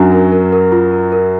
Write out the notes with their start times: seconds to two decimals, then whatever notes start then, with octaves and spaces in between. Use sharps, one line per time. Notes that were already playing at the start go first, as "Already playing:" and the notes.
Already playing: F#2 F#3 D4
0.12 A#4
0.32 A#4
0.52 A#4
0.72 F4
0.92 A#4
1.12 A#4